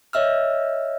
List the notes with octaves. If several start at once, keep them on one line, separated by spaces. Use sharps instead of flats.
C#5 D#5 E5 E6 F6